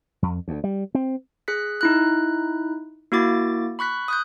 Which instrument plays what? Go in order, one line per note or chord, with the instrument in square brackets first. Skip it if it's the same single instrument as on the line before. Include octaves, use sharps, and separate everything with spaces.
[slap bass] F2
D2
G3
C4
[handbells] G#4 F#6 B6
D#4 E4 F#6
A#3 E4 F#4 D6 A6
B5 C#6 F#6 B6
D#6 F#6 G6